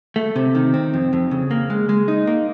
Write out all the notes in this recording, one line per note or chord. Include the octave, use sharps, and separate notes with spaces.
A3
C3
D#3
C4
F2
F2
C#3
A#3
G#3
G#3
D#4
A#3